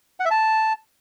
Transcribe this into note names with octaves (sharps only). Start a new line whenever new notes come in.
F#5
E5
A5